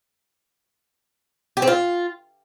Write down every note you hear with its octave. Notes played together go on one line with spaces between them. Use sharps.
G4
C4
F4